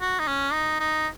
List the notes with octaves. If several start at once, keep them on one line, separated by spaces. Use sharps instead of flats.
F#4
D#4
C#4
D#4
D#4